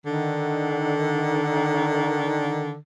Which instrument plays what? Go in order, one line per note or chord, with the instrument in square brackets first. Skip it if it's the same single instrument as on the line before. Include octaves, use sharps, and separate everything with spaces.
[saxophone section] D3 D#3